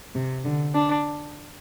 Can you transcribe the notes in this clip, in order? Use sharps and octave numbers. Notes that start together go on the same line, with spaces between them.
C3
D3
D4